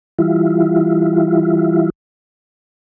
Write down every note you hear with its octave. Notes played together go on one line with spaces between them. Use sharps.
E3 G3 E4 F4